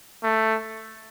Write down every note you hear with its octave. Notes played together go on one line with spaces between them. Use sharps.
A3